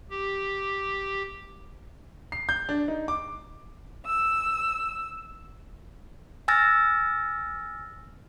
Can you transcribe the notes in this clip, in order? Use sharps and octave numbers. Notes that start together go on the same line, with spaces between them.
G4
C7
G6
D4
D#4
D6
E6
G#5 E6 F6 A6 A#6